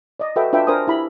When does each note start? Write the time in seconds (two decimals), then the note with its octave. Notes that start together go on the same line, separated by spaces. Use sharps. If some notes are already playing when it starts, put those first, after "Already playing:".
0.20 D5 D#5
0.36 F#4 A4 B4 D#5 E5 G5
0.53 D4 F4 B4 E5 G5
0.67 D4 A#4 C5 G#5 D#6
0.87 E4 G4 B5